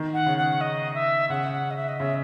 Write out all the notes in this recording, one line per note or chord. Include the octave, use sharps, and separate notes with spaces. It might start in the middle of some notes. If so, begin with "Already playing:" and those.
Already playing: D#3
F#5
C#3
F#5
D#5
E5
C#3 F#5
F#5
D#5
E5
D#5
C#3 E5